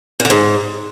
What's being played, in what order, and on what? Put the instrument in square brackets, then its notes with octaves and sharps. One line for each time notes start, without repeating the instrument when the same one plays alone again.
[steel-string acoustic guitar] A#2
D3
G#2